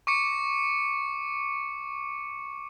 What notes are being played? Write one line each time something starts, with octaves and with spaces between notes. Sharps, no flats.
C#6 D6 C#7